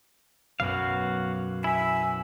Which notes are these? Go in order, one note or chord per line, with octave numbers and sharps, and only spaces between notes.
B1 F#2 F#4 F5
E4 E5 G#5